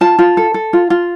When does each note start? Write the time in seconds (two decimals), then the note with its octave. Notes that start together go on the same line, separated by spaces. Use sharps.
0.01 F4 A5
0.19 F4
0.37 A4
0.54 A4
0.73 F4
0.90 F4